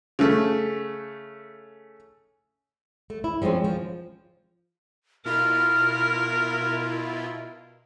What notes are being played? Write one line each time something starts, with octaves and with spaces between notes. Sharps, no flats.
C#3 A3
A3
E4
F3 G3 G#3 C4 C#4
F3
B2 E4 F4 A#4 F6